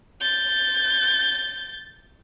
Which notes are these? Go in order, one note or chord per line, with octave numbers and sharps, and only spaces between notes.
G6 A6